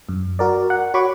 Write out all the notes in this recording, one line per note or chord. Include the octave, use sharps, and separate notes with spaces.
F#2
F#4 A#4 D5
F#5
F#4 C#5 B5 C#6 D6